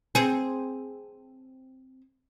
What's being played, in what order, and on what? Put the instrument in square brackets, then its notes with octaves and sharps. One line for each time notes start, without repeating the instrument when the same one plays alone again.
[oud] C4 G#4